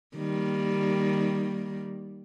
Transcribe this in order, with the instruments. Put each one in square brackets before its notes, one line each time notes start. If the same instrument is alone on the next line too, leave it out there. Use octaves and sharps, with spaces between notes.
[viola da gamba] D#3 G3 A#3